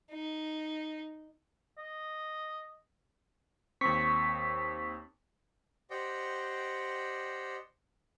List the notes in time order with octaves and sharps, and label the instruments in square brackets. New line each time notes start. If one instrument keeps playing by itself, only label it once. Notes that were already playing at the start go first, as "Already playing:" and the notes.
[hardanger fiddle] D#4
[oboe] D#5
[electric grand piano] D#2 C4 [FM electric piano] C#6 B6
[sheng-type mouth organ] G4 C5 D5 D#5 F#5 G5